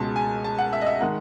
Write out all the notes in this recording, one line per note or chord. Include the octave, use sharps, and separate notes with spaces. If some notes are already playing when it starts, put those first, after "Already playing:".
Already playing: C#2 B2 G#3 A5
G#5
A5
F#5
E5
D#5
E5
D#3 G#3 D#4 F#5